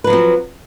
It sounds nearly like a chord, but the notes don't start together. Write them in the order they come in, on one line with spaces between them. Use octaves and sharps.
B4 F#3 F3 C4